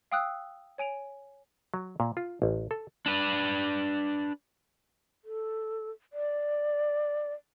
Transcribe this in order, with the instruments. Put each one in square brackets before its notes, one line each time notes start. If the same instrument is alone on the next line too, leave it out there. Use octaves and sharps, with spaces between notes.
[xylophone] F5 G5 D#6 E6 F#6
C#5 G#5 D7 F7
[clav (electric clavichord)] F#3
A#2
F4
A1
A4
[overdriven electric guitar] D4 B4
[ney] A4
D5